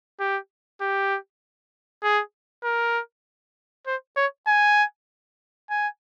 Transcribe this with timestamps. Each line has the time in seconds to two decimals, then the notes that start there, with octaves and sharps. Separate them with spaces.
0.20 G4
0.81 G4
2.03 G#4
2.64 A#4
3.87 C5
4.17 C#5
4.47 G#5
5.70 G#5